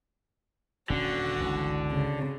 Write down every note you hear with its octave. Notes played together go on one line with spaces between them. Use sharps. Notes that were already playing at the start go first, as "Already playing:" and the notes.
D#1 D3 C#4 F#4
G1 C#2 E3
C#3